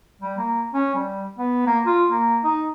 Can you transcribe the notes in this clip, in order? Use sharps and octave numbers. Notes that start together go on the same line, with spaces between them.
G3
A#3
C#4
G3
B3
A#3
F4
A#3
D#4